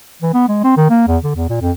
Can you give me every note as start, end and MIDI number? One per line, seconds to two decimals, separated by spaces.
0.22 0.33 52
0.34 0.46 59
0.49 0.61 56
0.64 0.75 60
0.77 0.90 51
0.90 1.05 58
1.08 1.17 40
1.24 1.35 50
1.36 1.49 40
1.49 1.57 46
1.61 1.71 41